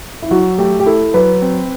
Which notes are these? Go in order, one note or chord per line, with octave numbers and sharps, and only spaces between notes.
E4
F#3 F#4
A3 G4
G4
E4 A4
F#3 B4
C4